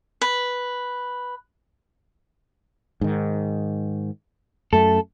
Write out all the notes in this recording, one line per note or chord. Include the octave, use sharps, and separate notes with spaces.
B4
G#2 D#3
F#2 A3 A4